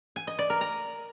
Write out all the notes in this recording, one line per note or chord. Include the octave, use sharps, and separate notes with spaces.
G#5
D#5
D5
A#4
A#5